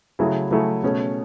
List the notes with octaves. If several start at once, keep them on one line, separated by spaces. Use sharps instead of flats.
C#3 F#3 A3 E4 G#4
C#3 F#3 A3 E4 G#4
B2 A3 C#4 G#4